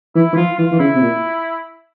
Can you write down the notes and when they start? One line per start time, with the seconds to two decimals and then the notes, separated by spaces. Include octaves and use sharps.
0.15 E3 E4
0.33 E3
0.36 F3 F4
0.58 E3 F4
0.72 E3
0.79 C#3 E4
0.95 C3
1.02 A#2